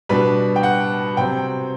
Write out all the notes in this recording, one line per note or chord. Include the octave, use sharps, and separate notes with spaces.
B2 G3 D4 B4 B5
G5
F#5
C3 F#3 C4 G5